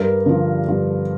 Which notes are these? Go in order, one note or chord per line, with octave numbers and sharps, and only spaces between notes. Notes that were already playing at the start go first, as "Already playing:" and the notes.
Already playing: G2 A#4
D3 F3
G2